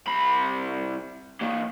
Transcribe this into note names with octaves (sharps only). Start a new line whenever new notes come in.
C2 B5
E3 A#3